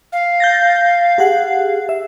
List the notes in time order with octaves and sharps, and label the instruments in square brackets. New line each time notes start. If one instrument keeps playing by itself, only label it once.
[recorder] F5
[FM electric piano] G6 A6 A#6
G4 G#4 F#5
E5